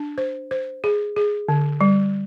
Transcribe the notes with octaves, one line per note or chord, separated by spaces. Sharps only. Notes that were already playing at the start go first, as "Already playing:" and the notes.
Already playing: D4
C5
C5
G#4
G#4
D3
G3